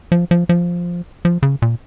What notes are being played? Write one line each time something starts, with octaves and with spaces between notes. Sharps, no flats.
F3
F3
F3
F3
C#3
A#2